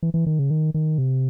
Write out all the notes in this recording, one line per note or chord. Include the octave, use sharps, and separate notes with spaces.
E3
E3
D#3
C#3
D#3
D#3
C3